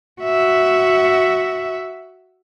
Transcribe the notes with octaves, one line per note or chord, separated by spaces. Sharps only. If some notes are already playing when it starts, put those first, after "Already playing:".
F#4 E5